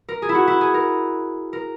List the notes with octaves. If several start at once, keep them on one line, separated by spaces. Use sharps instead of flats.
A#4
G#4
E4
F#4
E4
G#4
A#4
A#4